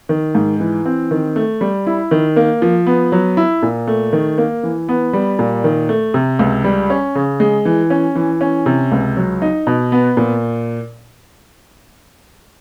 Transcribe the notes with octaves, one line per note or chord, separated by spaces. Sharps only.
D#3
G#2
E3
C4
D#3
A3
G3
E4
D#3
A#3
F3
B3
F#3
E4
A#2
A3
D#3
A#3
E3
B3
G3
A#2
D#3
A3
C3
C#2
G3
C#4
C#3
G#3
E3
C#4
E3
C#4
C3
C#2
F#3
D#4
B2
B3
A#2